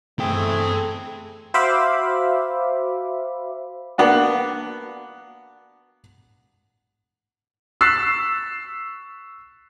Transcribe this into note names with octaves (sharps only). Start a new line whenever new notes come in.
E3 A3 C4 G#4 A4 G5
F#4 C5 E5 F5 B5 D6
A#3 B3 D4 F#4
C#6 E6 F#6 A6 B6 C7